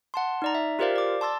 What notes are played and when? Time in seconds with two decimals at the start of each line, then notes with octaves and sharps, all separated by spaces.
0.14 F#5 A5 C6
0.42 D#4 D5 A#5
0.55 E5
0.79 F4 G4 A#4 C5 D5 F5
0.96 D5 D6
1.21 A5 C6 E6 A6